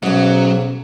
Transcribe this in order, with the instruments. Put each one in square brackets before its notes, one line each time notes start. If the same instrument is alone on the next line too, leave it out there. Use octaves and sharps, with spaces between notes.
[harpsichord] B1 G#2 [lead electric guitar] F#3 [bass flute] C#4